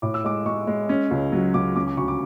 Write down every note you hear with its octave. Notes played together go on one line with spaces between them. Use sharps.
A2 D6
E6
G#3 D6
G#3 C#6
G#3
C#4
C#2
F#3
C#2 D6
C#4 D6
D6
D2 C#6
D6